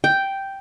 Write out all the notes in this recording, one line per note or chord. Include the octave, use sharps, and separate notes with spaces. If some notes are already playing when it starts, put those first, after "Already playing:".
G5